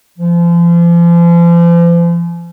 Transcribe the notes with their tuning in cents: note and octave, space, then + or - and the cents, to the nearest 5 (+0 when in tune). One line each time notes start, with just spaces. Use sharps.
F3 -40